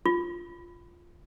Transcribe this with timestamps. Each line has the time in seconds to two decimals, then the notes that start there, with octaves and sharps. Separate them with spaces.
0.06 F4